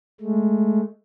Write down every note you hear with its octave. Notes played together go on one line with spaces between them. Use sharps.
G#3 A3